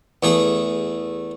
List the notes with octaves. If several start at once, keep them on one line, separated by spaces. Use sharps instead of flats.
E2 A3 G#4